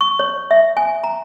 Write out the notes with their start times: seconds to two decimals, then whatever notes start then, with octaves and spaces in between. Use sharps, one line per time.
0.01 C#6
0.19 C#5
0.51 E5
0.77 G#5
1.04 A#5